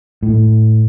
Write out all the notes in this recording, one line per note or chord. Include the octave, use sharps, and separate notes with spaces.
A2